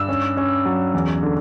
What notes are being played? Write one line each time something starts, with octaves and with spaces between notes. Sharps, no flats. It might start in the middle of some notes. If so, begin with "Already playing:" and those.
Already playing: G2 E6
C#4
C#4
F#3
E2
D3